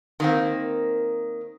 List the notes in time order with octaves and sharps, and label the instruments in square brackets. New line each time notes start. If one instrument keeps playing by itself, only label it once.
[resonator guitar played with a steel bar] D#3 A#3 C4